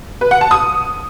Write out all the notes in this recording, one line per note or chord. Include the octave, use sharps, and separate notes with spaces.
B4
F#5
A5
D#6